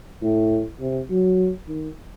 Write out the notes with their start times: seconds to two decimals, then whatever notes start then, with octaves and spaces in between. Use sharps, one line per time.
0.22 A2
0.80 C3
1.10 F#3
1.68 D#3